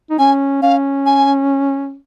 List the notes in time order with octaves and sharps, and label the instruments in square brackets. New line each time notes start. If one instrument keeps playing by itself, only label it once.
[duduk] D#4
[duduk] C#4 [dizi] G#5
[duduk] C#4 [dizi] F5
[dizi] G#5